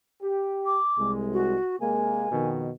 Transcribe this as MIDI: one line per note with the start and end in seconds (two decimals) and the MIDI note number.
0.22 0.78 67
0.66 1.12 86
0.99 1.56 36
0.99 1.56 56
1.33 1.76 66
1.81 2.30 48
1.81 2.30 56
1.81 2.30 58
1.81 2.48 80
2.32 2.71 41
2.32 2.71 47
2.32 2.71 51